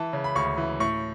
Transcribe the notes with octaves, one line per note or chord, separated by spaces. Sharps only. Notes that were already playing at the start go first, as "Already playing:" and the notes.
Already playing: E3 A5
C#3
B5
D2 C#6
E3
A2 C#6